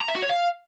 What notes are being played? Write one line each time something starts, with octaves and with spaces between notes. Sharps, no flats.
A#5
E5
F#4
C#5
F5